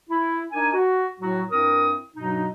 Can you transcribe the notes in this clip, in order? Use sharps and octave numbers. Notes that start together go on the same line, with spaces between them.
E4
D4 D#4 A#4 G#5
F#4
A2 F#3 F#4
G2 C4 E4 A#4 D#6
G2 B2 F#3 D#4